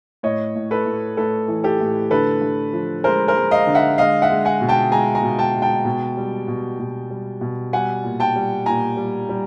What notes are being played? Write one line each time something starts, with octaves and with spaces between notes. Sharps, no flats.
A2 C#5 D#5
A2
A4 B4
A2
A2 A4 B4
E3
G4 A4
A2
D3 A4 B4
D3
F3
G#3 A#4 C5
A#4 C5
G#3
D#5 F5
D3
E5 F#5
G#3 D#5 F5
E5 F#5
G#3
F#5 G#5
B2
G5 A5
G#3 G#5 A#5
G#5 A#5
B2
G5 A5
G#3
G5 A5
B2
G3
B2
B2
G3
B2
G3 F#5 G#5
A#2
G5 A5
G3
A#2 G#5 A#5
G3
G3